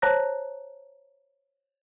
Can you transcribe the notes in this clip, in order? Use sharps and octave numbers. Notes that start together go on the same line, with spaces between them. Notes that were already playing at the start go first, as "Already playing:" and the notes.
C5 C#5 A5 A#5 F#6 A#6